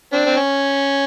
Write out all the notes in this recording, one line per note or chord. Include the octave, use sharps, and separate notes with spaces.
C4 D4
C4
C#4